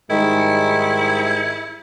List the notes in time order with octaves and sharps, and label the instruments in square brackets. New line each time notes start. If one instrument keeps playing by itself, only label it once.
[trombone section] G#2 G3 G#3 [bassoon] D#3 [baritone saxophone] E4